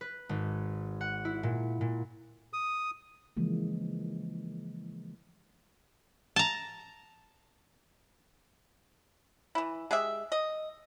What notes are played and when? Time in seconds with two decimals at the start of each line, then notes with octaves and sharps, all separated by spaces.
0.01 B4
0.29 G#1
1.01 F#5
1.25 E4
1.43 A#2
1.81 A#2
2.53 D#6
3.37 C#3 E3 F3 G#3 A#3
6.36 A5 A#5
9.55 E3 E4
9.91 G#3 G4 G#4 E5
10.32 D#5